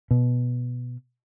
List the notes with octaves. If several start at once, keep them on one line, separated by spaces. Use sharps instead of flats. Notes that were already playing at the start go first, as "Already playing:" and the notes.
B2